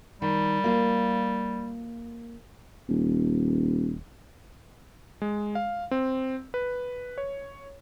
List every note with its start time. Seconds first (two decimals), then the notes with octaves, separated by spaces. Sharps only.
0.22 D#3 G3
0.64 A#3 F4
2.88 D#1
5.22 G#3
5.55 F5
5.91 C4
6.54 B4
7.18 C#5